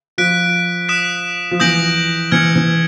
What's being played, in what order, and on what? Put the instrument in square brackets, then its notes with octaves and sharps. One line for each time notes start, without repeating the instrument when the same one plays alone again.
[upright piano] F3 [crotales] F#6 B6 D7
[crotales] D#6 F#6 B6 E7
[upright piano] F3
[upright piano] E3 [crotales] D#6 G6 A#6 D7 F#7
[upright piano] E3 [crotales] F6 G#6 C#7
[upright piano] E3